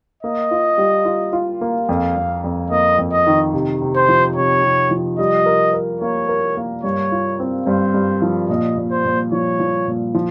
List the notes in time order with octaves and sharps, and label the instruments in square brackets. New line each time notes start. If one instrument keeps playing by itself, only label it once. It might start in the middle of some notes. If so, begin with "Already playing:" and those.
[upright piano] A#3 [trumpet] D#5
[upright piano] F4
G3
F4
F4
A#3
[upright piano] F2 [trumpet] F5
[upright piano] F2
F2
[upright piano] A#3 [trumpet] D#5
[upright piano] F2
[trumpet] D#5
[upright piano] D#3
C3
C3
[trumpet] C5
[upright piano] F3
[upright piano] C3 [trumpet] C#5
[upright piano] C3
F3
[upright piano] G3 [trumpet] D#5
[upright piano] A#4
A#4
[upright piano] A#3 [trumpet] C#5
[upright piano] A#4
A#3
[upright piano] G2 [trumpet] C#5
[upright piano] F4
C4
[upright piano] G2 [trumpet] C5
[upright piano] G2
F3
[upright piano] A#2 [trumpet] D#5
[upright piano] A#2
[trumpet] C5
[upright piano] A#2
[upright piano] F3 [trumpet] C#5
[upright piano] F3
A#2
F3